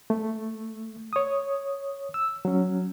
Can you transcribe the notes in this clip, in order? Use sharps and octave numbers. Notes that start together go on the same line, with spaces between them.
A3
C#5 D#6
E6
F#3 C#4